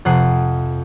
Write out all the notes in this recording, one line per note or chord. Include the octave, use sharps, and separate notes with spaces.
F2 C3 F#5 D#6 C7 D#7